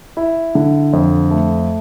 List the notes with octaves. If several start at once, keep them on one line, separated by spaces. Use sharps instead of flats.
E4
D3
F2
A3